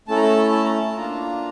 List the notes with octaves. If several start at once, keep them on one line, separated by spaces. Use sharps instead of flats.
A3 C#4 E4 A4 A5
A#5
A5
A5
A#5
A5
A#3 D4 F4 A#5